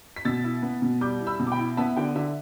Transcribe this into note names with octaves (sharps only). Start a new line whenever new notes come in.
B6
B2 E6 A6
E4
B3
B2
G3 D6 G6
E4
B5 E6
B2
D6
G5 B5
E4
B3 E5 A5
D3 G5
D3 E5